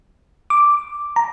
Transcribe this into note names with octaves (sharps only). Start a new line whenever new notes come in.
D6
A#5